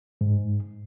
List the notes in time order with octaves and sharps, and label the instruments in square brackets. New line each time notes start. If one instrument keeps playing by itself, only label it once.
[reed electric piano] G#2